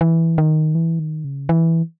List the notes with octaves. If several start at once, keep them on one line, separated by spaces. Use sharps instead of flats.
E3
D#3
E3
D#3
C#3
E3